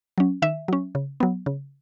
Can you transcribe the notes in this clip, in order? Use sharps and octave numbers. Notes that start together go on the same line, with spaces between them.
F#3 C#4
D#3 E5
F#3 C#4
C#3
F#3 B3
C#3